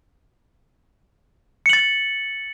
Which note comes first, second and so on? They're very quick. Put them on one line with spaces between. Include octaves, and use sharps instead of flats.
C#7 F#7 A6